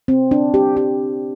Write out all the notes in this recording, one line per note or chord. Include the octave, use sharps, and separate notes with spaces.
C4
D4
G4
G4